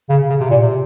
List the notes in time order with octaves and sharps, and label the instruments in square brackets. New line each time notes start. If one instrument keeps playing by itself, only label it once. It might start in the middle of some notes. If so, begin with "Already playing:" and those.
[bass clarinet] C#3
C#3
C3
A#2
C3